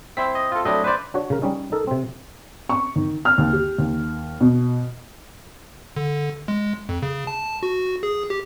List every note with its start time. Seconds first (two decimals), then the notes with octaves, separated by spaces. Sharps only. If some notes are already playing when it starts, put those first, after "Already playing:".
0.17 C4 E4 C5 B6
0.35 D#5
0.52 F4 A4
0.65 F#3 A3 C4 D4 E4 D#5
0.84 B4 C5 D5
1.14 D4 F#4 C#5
1.30 C#3 A#4
1.42 G3 C#4 D#4
1.72 D#4 A4 A#4
1.87 C3 C4
2.69 C#6
2.96 D#3
3.25 F6
3.38 D#2
3.53 G4
3.78 D#2
4.41 B2
5.97 D3
6.48 G#3
6.89 F2
7.02 C#3
7.27 A5
7.63 F#4
8.03 G#4
8.30 G4